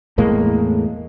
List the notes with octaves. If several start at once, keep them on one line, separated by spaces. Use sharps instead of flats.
E2 A2 G#3 A#3